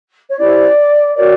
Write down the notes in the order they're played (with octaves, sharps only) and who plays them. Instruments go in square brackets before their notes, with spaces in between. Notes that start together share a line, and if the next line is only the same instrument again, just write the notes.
[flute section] C#5
C#4 E4 G4 C5 D5
F#4 A#4 C#5 D5